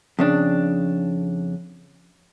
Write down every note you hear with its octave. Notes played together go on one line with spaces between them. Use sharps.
F2 C#3 D4